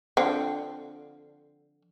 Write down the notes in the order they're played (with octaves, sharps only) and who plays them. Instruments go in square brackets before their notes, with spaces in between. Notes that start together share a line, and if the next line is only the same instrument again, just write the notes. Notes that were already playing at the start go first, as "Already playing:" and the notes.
[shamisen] D3 F3 C4